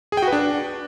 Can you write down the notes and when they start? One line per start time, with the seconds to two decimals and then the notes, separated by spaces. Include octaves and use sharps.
0.12 G#4
0.17 G5
0.22 F#4
0.28 B4
0.33 D4